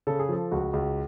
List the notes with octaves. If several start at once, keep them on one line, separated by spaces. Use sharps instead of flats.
C#3 A4
G#4
F3 A4
C#2 F#4
C#2